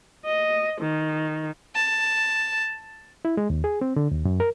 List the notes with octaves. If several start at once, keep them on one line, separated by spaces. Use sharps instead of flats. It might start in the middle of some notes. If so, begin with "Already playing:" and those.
D#5
D#3
A5
E4
G#3
D#2
G#4
C4
D3
D#2
F#2
A#4